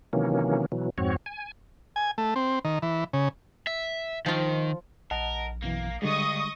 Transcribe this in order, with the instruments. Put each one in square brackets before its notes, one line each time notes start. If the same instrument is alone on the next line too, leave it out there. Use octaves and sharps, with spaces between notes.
[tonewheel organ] C3 D#3 E3 F#3 A#3 C#4
B2 E3 F#3
F2 G#2 C4 F#4 C#5
G#5
[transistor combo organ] G#5
A3
C4
D#3
E3
C#3
[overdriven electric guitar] E5
[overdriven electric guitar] D#3 [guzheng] F3 F4
[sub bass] A#1 [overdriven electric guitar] A#4 [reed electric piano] D#5 F#5 A5
[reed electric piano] F#2 B2 E3 [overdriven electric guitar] A#3
[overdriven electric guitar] G2 [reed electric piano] D3 G3 G#3 [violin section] D#5 C#6 D#6